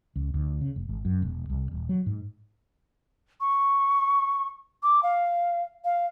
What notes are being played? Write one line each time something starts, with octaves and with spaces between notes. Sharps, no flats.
C#2
D2
C#3
F1
G#1
F#2
E1
C2
D#1
F#3
G#2
C#6
D6
F5
F5